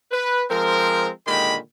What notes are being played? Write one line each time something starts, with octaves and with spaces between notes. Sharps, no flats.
B4
F3 G#3 C4 A#4
A#2 D3 D#3 G#3 G4 B5